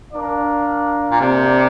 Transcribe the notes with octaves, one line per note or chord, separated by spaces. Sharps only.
D4 A#4 D5 F5
A#2
C3 A#3 D4 G4 D5